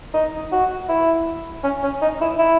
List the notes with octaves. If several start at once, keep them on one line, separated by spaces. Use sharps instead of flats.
D#4
F#4
E4
C#4
C#4
D#4
E4
E4